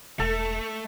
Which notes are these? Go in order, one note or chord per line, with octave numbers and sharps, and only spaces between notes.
E1 A3 A4